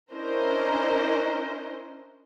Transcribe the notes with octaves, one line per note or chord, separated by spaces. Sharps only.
C#4 D4 E4 A#4 C5 D#5